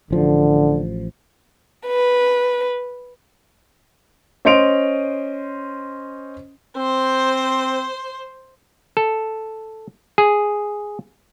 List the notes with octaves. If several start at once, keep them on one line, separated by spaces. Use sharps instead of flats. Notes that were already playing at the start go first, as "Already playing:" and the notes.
A1 D3 F3
B4
C#4 C5 D#5 C6 D7 F7
C4 C5
A4
G#4